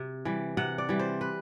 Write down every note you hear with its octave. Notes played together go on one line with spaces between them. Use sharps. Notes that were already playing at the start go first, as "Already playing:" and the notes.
Already playing: C3
E3 G3
C3 F#5
D5
E3 G3
C5
B4